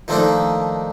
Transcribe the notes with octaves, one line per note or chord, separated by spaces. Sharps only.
D#3 F3 A3 A#3 D4 D#4